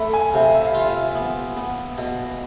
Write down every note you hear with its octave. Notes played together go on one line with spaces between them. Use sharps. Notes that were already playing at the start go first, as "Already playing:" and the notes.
Already playing: A3 B5
G#5
C3 F5
E5
F5
F4
E5
B3
B3
B2